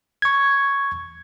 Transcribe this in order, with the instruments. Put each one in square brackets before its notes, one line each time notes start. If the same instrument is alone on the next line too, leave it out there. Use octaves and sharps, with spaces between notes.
[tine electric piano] C#6 G#6